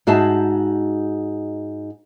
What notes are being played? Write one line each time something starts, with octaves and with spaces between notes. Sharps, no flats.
G#2 D#4 F#4 G#4 E5 A5